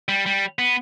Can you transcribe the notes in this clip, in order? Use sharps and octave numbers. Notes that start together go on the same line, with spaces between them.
G3
G3
B3